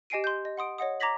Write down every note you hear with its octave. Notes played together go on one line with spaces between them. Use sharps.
G4 D#5 G#5 C7 D7 D#7
C6 G6
D#5
F#5 C6 D#6 D7
C#5 D#5 F#5 D#6
A#5 D6 G#6 A#6 B6 F#7